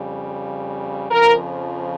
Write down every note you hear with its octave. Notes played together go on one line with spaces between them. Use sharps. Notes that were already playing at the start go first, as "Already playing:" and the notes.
Already playing: F2 C#3 G3
F2 C#3 F3 A#4